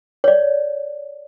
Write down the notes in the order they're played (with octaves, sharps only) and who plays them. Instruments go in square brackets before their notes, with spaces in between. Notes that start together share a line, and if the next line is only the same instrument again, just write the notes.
[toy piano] C#5 D5